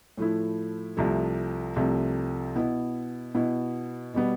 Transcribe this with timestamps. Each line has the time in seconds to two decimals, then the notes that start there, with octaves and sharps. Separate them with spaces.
0.18 A2 F3 A3 E4
0.97 C2 C3 F3 A3
1.76 C2 C3 F3 A3
2.56 B2 B3 E4
3.35 B2 B3 E4
4.14 B2 G3 B3